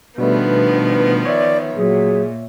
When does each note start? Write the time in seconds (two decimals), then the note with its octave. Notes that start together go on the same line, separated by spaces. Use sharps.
0.18 B2 D#3 F3 G3 A3 B3 D4 B4
1.25 C#5 D5 E5
1.77 A#2 F#3 G#4